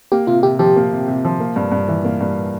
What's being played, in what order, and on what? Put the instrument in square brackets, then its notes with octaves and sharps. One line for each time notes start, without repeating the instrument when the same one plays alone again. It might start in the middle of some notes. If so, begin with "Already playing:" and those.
[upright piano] A#3 [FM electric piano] G4
[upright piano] C3 [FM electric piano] F4
[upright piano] C3 [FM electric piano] G4
[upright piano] F3 [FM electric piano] G4
[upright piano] A#3
C3
C3
F3
A#3
G2
G2
E3
A#3
G2